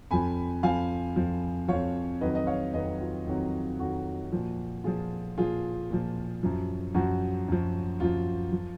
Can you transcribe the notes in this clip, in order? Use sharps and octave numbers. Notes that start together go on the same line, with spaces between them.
F2 F3 G#5 B5
F2 F3 F5 G#5
F2 F3
F2 F3 C#5 F5
F2 D#3 F#3 B4 D#5
D#5
C#5 F5
F2 D#3 F#3 B4 D#5
F4
F2 D#3 F#3
F2 D#3 F#3 F#4
A#2 F3
A#2 F3 F4 G#4
A#2 F3 F4 G#4
A#2 F3
F#2 F3
F#2 F3 F#4
F#2 F3
F#2 F3 F4
F3